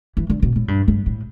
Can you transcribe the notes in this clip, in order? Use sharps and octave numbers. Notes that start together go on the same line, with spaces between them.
E3
D3
B2
A2
G2
G2
A2